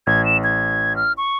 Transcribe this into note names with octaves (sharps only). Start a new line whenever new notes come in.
A1 G#6
E7
G#6
F6
C#6